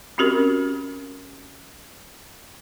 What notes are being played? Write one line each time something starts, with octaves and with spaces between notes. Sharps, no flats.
C4 C#4 F#4 G4 A#4